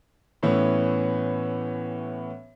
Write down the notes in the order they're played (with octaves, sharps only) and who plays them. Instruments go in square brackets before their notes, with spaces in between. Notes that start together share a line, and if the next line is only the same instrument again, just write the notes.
[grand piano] A2 E3 B3 C#4